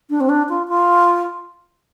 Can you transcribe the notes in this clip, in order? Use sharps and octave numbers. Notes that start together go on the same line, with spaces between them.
D4
C4
D4
F4
F4